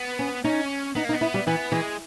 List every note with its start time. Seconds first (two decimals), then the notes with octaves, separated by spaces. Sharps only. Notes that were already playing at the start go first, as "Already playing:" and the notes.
Already playing: B3
0.19 C#4
0.44 C#4 D#4
0.95 B3 D#4
1.04 A#3
1.09 D#4
1.13 B3
1.21 E4
1.34 G3
1.47 E3 B3
1.72 E3 G#3